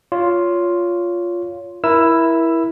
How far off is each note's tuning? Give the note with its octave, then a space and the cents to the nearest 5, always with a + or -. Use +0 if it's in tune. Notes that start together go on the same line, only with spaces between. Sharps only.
F4 +0 C#5 +25
E4 +0 A#4 +25 E6 +15